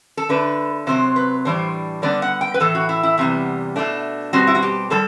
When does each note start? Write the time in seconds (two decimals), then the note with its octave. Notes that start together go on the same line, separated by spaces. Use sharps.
0.17 A4
0.29 D3 A3 D4 B4
0.87 C3 F#3 C4 C5
1.16 B4
1.45 A2 E3 G3 D4 C5
2.02 D3 G3 B3 D4 D5
2.22 F#5
2.41 G5
2.54 B4
2.60 A2 E3 A3 A4
2.75 F#4
2.89 E4
3.03 E4
3.18 E2 C3 G3 B3
3.76 B2 A3 D4
4.33 B2 G3 C4 F#4
4.47 E4
4.55 F#4
4.62 G4
4.90 A2 G3 A4